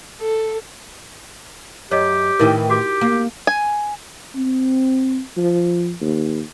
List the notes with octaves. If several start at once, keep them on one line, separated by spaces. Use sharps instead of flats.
A4
F#2 G4 C#5 D#5
A2 D#3 E3 D#4 E4 A#4
F#4 G4 D6
A#3
G#5
C4
F3
D#2